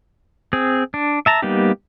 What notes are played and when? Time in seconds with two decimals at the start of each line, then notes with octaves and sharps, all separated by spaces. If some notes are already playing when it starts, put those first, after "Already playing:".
0.53 C4 G#4
0.94 D4
1.26 E5 A5 A#5
1.42 G3 A#3 B3 D#4 G4